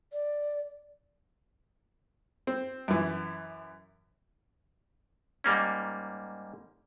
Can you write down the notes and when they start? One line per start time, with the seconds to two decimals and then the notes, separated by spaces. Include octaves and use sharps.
0.13 D5
2.47 C4
2.88 F#2 E3
5.44 G#2 G3 A#3 C#4